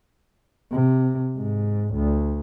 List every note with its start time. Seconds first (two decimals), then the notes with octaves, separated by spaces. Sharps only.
0.71 C3
1.37 G#2
1.94 D2